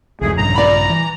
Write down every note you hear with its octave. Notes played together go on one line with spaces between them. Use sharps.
C2 F2 G#2 A3 G#4
A#1 G2 C#3 A#5
D5 B5
E3